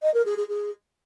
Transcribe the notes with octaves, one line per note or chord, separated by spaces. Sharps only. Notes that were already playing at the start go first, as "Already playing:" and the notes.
D#5
A#4
G#4
G#4
G#4